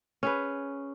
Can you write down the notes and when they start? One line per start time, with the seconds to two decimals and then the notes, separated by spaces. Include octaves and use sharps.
0.23 C#4 G#4 B4